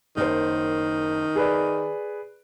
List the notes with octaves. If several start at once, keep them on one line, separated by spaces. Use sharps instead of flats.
F#1 D#3 C5
G#4 B4 D5